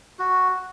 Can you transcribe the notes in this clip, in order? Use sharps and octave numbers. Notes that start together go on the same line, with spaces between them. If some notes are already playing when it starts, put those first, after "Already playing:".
F#4